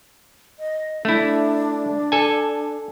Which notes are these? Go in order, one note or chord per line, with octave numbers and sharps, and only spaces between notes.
D#5
A3 D4 E4
A4 G#5